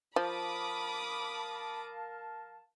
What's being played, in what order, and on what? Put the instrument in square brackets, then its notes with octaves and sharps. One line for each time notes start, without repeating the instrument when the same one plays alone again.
[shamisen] F3 [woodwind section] A#4 F5 A5 [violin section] B5 D6 D#6